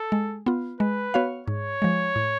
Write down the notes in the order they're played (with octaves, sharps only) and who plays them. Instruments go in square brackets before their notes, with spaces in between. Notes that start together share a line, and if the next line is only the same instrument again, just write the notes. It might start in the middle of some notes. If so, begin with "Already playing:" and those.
Already playing: [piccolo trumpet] A4
[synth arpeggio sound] G#3
B3 F4
[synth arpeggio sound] G#3 [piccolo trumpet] B4
[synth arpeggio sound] B3 F#4 C#5 F5
[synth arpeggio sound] G#2 [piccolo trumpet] C#5
[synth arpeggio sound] F3 G#3
A2